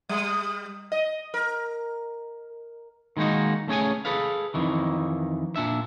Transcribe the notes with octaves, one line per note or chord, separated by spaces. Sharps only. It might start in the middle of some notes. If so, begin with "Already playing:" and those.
G3
D#5
A#4
D#3 G#3 A#3 D#4 F#4
A3 C#4 G#4 C#5 G#5
G#4 A4 B4 F5
F2 D#3 E3
A#2 D4 E5